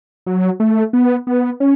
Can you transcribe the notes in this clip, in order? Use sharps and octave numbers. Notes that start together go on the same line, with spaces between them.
F#3
A3
B3
B3
C#4